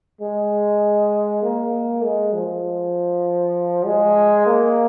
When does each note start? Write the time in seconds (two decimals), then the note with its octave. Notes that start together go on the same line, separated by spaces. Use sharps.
0.21 G#3
1.43 A#3
2.04 G#3
2.33 F3
3.86 G#3
4.47 A#3